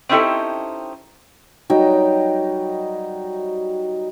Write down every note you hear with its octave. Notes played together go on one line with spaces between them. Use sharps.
C4 C#4 D#4 E4 G4 A4
F#3 G3 D#4 G5